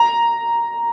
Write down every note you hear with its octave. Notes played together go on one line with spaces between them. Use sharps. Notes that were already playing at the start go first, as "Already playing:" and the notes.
Already playing: A#5